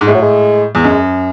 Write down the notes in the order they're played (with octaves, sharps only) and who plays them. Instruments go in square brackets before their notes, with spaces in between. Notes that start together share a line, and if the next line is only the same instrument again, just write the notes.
[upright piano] G#2
[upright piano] A2 [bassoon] G#3
[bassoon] F#3
G#3
[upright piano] E2
[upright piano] F#2 [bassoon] G#3